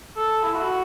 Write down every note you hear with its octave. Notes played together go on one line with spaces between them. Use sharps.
A4
E4
F#4